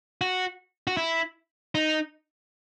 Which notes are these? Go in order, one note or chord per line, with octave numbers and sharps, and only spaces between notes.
F#4
F#4
E4
D#4